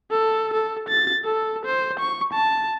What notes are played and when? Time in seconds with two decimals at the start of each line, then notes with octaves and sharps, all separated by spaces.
0.11 A4
0.53 A4
0.89 A6
1.25 A4
1.66 C5
1.99 C#6
2.33 A5